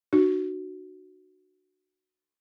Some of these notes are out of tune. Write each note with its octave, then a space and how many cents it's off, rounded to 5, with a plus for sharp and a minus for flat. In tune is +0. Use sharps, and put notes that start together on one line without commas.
D4 +45 F#4 +0